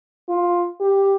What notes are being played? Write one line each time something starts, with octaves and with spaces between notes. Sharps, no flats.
F4
G4